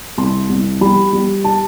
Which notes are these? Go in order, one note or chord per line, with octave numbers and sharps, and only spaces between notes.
C2 C6
C2
G3 B5
G3
A5